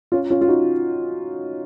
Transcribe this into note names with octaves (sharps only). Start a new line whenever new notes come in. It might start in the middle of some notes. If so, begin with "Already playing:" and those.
C#4 F4
C#4 F4
F4
D#4 F#4